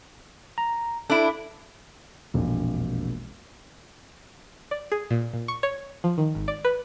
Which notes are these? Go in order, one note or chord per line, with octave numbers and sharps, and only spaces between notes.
A#5
D4 E4 A4
E1 A#1 F2 A#3
D5
G#4
A#2
A#2
C#6
C#5
F3
D#3
G#1
D5
B4